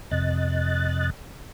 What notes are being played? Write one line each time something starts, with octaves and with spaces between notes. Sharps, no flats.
F2 C3 D#5 F#6 A6